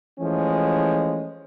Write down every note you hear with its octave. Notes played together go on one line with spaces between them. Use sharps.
E3 F3 G#3 A3 C#4